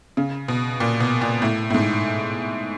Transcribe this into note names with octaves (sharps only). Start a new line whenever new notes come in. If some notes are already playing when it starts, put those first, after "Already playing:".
C#3
B2
A#2
B2
A#2
A2
A2
G#2